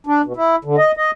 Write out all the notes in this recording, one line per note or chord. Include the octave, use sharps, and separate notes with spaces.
D4
B2
E4
D3
D#5
D#5